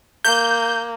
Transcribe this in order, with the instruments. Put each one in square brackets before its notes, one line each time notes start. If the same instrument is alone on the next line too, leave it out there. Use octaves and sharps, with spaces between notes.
[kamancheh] A#3 [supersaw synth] G6